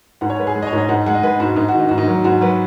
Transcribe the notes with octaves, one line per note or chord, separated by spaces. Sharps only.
G#2 F#5
C#5
G#3 B4
G#4
G#3
D#5
C#5
G#2
D#5
G#2 F#5
G#3 F#5
D#5
G#3 B4
G#2 F#4
G#2 D#4
F#4
D#3
D#4
G#2 F#4
D#4
F#3
G#2 F#4
F#3 B4